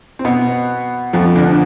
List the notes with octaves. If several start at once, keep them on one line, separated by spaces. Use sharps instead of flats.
C4
B2 B3
F2 F3
D2 D3